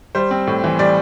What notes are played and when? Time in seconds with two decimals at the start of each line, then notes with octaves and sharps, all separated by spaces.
0.15 G3 C5
0.31 C4
0.47 A2
0.64 E3
0.79 G3 D5